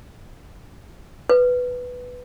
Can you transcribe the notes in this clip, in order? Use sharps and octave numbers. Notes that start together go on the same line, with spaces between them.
B4